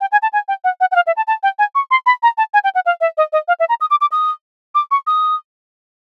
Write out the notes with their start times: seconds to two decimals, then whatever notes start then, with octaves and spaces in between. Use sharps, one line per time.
0.01 G5
0.12 G#5
0.22 A5
0.33 G#5
0.48 G5
0.64 F#5
0.80 F#5
0.91 F#5
0.96 F5
1.07 E5
1.17 A5
1.27 A5
1.43 G5
1.59 G#5
1.75 C#6
1.91 C6
2.06 B5
2.23 A#5
2.38 A5
2.54 G#5
2.64 G5
2.75 F#5
2.86 F5
3.01 E5
3.17 D#5
3.33 D#5
3.48 F5
3.60 E5
3.69 A#5
3.81 D#6
3.91 D6
4.01 D6
4.12 D#6
4.75 D6
4.91 C#6
5.07 D#6